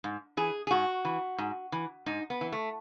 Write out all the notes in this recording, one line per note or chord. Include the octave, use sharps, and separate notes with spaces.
G#2
E3 G#4
G#4
G#2 F#4
E3
G#2
E3
G#2 D#4
B3
E3
A3